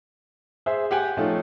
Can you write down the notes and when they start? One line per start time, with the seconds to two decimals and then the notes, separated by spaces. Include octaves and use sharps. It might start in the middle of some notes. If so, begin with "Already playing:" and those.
0.66 G#4 C5 E5
0.91 G4 F#5 G#5
1.17 F3 A3 C#4 D#4 F4